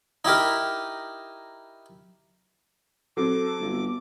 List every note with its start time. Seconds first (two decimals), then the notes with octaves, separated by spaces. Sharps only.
0.25 D#4 E4 G4 A#4
3.17 F#3 C4 A4 D6
3.61 G1